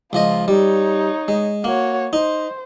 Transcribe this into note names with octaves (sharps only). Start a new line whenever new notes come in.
C#2 F3 F4 D#5
G3 D#4 C#5
G#3
A#3 F#4 C#5
D#4 C5